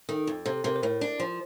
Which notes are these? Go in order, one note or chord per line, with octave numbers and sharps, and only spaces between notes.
D#3 A4
F2
C3 A4
C3 A#4
C5
A2 A#4
D4
F3